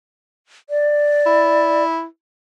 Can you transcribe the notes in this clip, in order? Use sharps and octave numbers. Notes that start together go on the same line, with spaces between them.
D5
E4